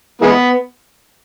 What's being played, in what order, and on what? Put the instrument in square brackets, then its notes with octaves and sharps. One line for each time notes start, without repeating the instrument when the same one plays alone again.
[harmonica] E3 G#3 B3